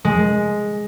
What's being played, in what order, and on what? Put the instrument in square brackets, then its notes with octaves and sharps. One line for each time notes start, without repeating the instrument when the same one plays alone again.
[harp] G#3